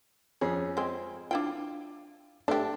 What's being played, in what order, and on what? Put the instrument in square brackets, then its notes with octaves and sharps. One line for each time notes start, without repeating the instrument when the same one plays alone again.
[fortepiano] F2 C#4 G#4
[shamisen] G#3 C4
[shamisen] D4 E4 G5 [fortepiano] F4
[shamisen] A3 G4 [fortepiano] D4